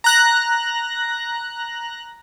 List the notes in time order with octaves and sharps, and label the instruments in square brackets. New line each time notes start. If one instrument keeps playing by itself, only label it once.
[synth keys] A#5 F#6 A#6